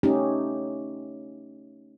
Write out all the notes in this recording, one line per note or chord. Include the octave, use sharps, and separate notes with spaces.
A3 C#4 D#4 G4